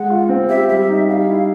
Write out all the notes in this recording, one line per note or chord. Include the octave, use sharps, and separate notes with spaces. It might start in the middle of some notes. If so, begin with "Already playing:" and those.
Already playing: G#3 F#5
F4
C4
G4 E5
G3 E5
D#4
G3 F5 F#5
E4